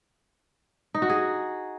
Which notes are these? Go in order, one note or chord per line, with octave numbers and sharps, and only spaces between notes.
D#4
F#4
G#4